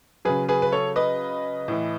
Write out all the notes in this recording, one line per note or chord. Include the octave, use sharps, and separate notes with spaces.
C#3 F#3 G#4 B4
G#4 B4
B4
A4 C#5
B4 D#5
A2 E3